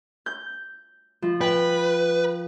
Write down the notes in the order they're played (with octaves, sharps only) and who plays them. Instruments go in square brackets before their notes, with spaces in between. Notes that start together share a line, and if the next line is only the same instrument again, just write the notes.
[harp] G6
F3
[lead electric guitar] B4 [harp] G5